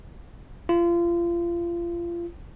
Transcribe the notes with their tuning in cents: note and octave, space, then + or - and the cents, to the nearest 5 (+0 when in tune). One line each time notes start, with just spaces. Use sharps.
F4 -30